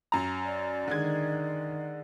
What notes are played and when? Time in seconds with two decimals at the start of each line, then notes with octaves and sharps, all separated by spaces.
0.12 F#2 A#5
0.46 D5
0.88 D3 D#3 G#3 G#6